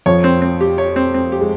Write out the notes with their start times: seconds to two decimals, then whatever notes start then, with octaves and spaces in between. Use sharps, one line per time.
0.06 F2 F3 C#5
0.24 C4
0.42 C4
0.61 G4
0.78 C#5
0.96 C4
1.14 C4
1.32 G4
1.41 G#3